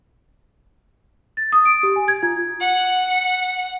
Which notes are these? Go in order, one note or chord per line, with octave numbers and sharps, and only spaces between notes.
A6
D#6
D7
G4
G#5
G#6
F4
F#5 C#7